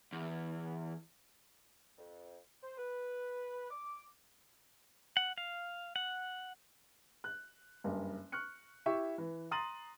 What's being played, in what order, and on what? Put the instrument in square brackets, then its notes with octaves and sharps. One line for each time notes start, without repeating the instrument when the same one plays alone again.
[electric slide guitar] E2
[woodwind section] F2
C5
B4
D6
[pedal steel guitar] F#5
F5
F#5
[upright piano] F#6
F#1 G2
C#6 F6 F#6 C#7
E4 G4 E5 C#6
E3
A#5 C6 D#6 A6 D#7 F#7